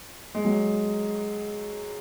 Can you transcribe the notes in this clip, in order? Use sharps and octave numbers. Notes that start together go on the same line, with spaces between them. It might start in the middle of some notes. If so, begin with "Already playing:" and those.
G#3
F#3